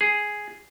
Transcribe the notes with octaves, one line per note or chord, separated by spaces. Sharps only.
G#4